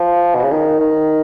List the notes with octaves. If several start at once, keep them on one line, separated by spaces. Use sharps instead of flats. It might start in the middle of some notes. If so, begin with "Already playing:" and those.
Already playing: F3
B2
C#3
D#3
D#3